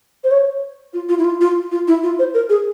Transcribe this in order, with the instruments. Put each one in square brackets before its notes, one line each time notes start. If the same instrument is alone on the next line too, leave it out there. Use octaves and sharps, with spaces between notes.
[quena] C5
C#5
F4
F4
E4
F4
F4
F4
E4
F4
C5
A#4
G#4